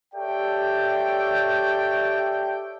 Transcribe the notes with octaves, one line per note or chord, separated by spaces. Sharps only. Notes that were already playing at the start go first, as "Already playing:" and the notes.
G4 A4 C#5 D5 E5 G5